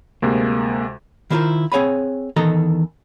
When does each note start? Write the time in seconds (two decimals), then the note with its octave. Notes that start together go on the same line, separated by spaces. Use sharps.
0.22 D2 C3 G#3 A#3
1.30 D#3 E4 F4 G4 A#4 C5
1.72 C4 G#4 C#5 F#5 G#5 B5
2.36 E2 D#3 E3 A4 D#5 A#5